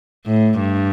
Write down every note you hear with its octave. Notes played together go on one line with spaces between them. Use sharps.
A2
G2